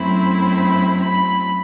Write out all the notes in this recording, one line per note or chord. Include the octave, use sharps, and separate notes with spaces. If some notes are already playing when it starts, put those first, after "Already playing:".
Already playing: F#2 F#3 A3 C4 E4 B5
B5
B5